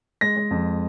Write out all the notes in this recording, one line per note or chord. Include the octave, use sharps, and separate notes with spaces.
G#3 A#6
G#3
F2